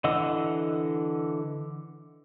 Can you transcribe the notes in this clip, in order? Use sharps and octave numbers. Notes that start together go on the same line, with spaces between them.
D3 E3 D#5 F#5 E6